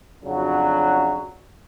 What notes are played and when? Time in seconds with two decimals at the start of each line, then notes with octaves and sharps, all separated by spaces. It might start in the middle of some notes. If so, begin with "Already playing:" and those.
0.24 F2 C#3 F#3 D4 F#4